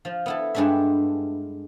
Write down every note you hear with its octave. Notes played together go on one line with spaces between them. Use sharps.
F3 F4
B3 E4 A4
G2 G#3 D4 A4 E5